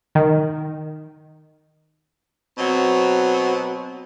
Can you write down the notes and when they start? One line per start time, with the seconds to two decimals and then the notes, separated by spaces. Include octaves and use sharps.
0.15 D#3
2.58 B2 F#3 C4